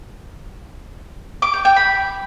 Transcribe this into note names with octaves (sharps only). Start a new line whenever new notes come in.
D6
G5
G5
B5